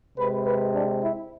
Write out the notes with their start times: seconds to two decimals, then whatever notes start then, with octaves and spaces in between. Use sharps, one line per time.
0.17 C3 G#3 C4 B4
0.46 B4
0.74 D4
1.03 E4